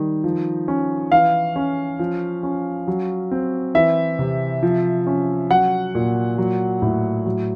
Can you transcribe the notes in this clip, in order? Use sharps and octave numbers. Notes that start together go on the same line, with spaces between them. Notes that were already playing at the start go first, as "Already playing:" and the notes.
Already playing: D#3 G3
F3
C#4
E3 F5
C#4
F3
C#4
F#3
C4
E3 E5
C3
F3
C#4
F#3 F#5
A#2
F#3
A2
F#3